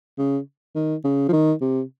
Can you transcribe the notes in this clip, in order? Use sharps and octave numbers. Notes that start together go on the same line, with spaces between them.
C#3
D#3
C#3
F3
D#3
C3